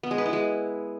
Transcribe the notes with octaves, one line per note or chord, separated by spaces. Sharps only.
B3
G#3
B4
E4
G#3